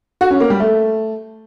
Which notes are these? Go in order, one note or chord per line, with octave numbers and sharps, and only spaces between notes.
F#4
C#4
A#3
G3
A3